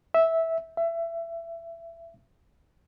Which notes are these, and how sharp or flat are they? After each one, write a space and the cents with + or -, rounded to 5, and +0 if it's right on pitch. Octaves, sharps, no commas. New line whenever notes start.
E5 -10
E5 +25